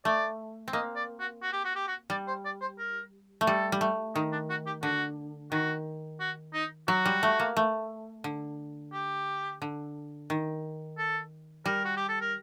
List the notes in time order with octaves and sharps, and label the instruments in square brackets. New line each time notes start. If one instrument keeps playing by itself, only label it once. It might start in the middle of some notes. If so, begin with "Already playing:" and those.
[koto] A3 [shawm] D5
[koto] C4
[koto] A#3 [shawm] D#5
[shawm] D5
F#4
F#4
G4
F#4
G4
F#4
[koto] G3 [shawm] D5
[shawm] C5
D5
C5
A#4
[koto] A3
[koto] G3 [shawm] A4
[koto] G3
A3
[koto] D#3 [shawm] D#4
[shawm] D4
F#4
G4
[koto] D3 [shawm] F#4
[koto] D#3 [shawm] F#4
[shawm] F#4
D#4
[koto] F#3 [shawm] F#4
[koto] G3
A3
A#3
A3
D3
[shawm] G4
[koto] D3
D#3
[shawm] A4
[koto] G3 [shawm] A#4
[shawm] F#4
G4
A4
A#4